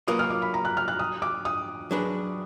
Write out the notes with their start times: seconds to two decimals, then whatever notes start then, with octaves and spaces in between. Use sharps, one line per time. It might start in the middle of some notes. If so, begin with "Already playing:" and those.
0.08 F#3 A#3 F4 B4 D#6
0.19 F6
0.30 D6
0.42 B5
0.54 A#5
0.65 F#6
0.77 F6
0.88 F#6
0.99 D#6
1.22 D6
1.45 D#6
1.91 F#3 D4 G#4 B4